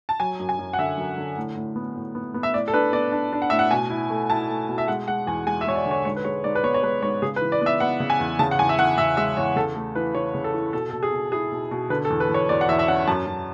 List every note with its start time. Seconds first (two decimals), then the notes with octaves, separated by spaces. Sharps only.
0.09 A5
0.20 F#3 G#5
0.40 F#2
0.49 G#5
0.59 F#2
0.73 F#5
0.79 D3 E5
0.97 F#2
1.18 D3
1.37 A2
1.56 A2
1.76 B3
1.96 A2
2.15 B3
2.34 B3
2.43 E5
2.54 A2 D5
2.68 A4
2.74 D4 B4
2.93 B3 D5
3.12 D4
3.33 D4
3.42 F#5
3.50 A2 E5
3.59 F#5
3.71 B2 G#5
3.90 E4
4.10 A3
4.30 E4 A5
4.49 A3
4.69 B2
4.78 E5
4.88 G#3 F#5
5.08 G#3 F#5
5.27 E2 G#5
5.46 G#3 G#5
5.61 E5
5.66 G#3 C#5
5.76 D5
5.85 D3
5.91 C#5
6.05 G#2 C#5
6.16 B4
6.25 G#3 C#5
6.44 G#2 D5
6.55 B4
6.63 B3 C#5
6.74 C#5
6.83 G#3 B4
7.02 G#2 C#5
7.22 C#3 G#4
7.36 B4
7.41 E3
7.52 D5
7.61 B3 E5
7.80 B3 F#5
8.00 C#3
8.10 G#5
8.20 E2
8.39 C#3 A5
8.51 F#5
8.59 E2 G#5
8.69 E5
8.78 E2 F#5
8.98 E2 E5
9.17 G#3 E5
9.37 E2 C#5
9.56 C#3 A4
9.76 A3
9.95 E3 B4
10.14 E3 C#5
10.35 C#3
10.44 A4
10.54 E3
10.73 B2 A4
10.90 B2 A4
11.03 G#4
11.12 B2
11.32 E4 G#4
11.52 B2
11.71 B2
11.90 D3 B4
12.05 A4
12.10 E2
12.20 B4
12.29 E2
12.34 C#5
12.49 E2 D5
12.61 F#5
12.69 E2 E5
12.79 E5
12.88 C#4 F#5
13.07 F#2 A5
13.27 F#2